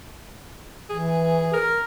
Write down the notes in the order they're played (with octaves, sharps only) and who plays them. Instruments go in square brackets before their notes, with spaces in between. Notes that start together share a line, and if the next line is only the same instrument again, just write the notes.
[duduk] E3 [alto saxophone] G#4
[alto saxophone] A#4